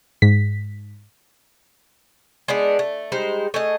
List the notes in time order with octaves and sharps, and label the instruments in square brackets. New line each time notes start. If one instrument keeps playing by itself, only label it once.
[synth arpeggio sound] G#2 B6
[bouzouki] G#3 B3 D4 D#4
A3
G3 G#3 D#4 C5
A3 G#4 D#5